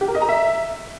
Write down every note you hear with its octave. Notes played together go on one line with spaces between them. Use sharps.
G4
A#4
D#5
A#5
E5